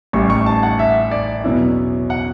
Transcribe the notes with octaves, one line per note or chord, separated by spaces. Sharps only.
A1 A2 G3 C#6
C#6
A5
F#5
E5
D5
E2 B2 F#3 C#4 E4
F#5